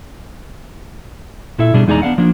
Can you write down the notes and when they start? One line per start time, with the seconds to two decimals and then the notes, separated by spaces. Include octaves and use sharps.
1.58 A#2 E4 A4 E5
1.74 B2 G3 D4 G#4
1.87 E2 G#3 D#4 G#4 D5 A#5
2.02 B3 D4 F5 F#5
2.18 F3 A#3 D4